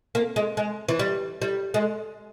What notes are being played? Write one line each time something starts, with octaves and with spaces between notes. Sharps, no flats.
A#3
G#3
G#3
E3
G3
G3
G#3